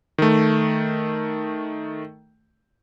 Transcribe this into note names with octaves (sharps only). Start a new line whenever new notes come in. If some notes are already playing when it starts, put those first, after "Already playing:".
D#3 A3